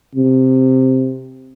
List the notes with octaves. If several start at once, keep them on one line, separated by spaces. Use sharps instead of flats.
C3